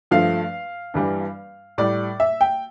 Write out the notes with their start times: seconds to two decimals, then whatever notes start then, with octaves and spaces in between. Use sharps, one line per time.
0.11 G2 F3 A3 F5
0.94 G2 E3 G3
1.78 A2 G3 D5
2.20 E5
2.41 G5